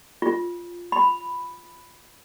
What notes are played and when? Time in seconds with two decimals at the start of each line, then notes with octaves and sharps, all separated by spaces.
0.22 F4
0.92 B5